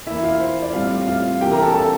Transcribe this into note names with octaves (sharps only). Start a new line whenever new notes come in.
E3 A#3 E4 E5
F4 F5
C5
D5
A2 G3 C4 F4 F5
F4 F5
C3 E3 A#3 G4 G5
A#4 A#5
A4 A5
A4 A5